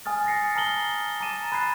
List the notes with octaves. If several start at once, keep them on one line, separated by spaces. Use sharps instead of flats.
G#5 D#6 F6 A6
A6 A#6 C7 C#7
A5 A#5 D#6 F6 F#7 G7
A5 A#5 D6 A6 D#7 E7
B5 F#6 G#6 A6 C7